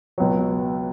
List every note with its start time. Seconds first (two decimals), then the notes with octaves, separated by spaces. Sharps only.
0.18 C#2 B2 F#3 C#5